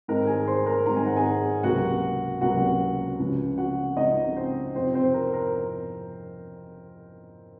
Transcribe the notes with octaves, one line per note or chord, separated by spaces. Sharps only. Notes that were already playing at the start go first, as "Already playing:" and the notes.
G#2 D#3 G#3 C4 D#4 A#4 A#5
G#4 G#5
C5 C6
A#4 A#5
G#2 D#3 G#3 C4 D#4 A#5
G#5
F#5
G#4 G#5
C#2 C3 F#3 A#3 F#4 F#5
C#2 C3 F#3 A#3 F#4 F#5
C#2 C#3 F3
F#4 F#5
C#2 C#3 F3 D#4 D#5
C4 C5
F2 C3 F3 C4 D#4 C5
C4 C5
A#4
A#4